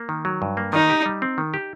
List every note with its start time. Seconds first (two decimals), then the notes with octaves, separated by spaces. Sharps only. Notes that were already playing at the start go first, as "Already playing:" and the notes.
Already playing: A#3
0.09 D#3
0.25 F#3
0.42 G2
0.57 A#3
0.73 D#3 D#4
0.90 G4
1.06 G3
1.22 C4
1.38 D#3
1.54 G4